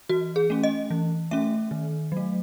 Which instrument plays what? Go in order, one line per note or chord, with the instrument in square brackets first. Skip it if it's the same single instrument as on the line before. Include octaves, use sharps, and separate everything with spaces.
[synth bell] E3 F#4
G#4
A3 C#4
D#5
E3
A3 C#4 E5
D#3
F#3 A3